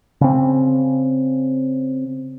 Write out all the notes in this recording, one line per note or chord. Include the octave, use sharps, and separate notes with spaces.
C#3 C4